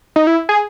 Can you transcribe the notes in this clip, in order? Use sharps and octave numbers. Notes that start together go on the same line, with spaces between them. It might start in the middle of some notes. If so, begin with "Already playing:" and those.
D#4
E4
G#4